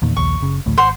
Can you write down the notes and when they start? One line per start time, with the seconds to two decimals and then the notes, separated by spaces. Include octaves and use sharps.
0.02 E2 A#2 D#3
0.17 A#1 D#2 C#6
0.41 F#1 C#3
0.66 A1 D2 A2
0.77 G#1 C5 F#5 C6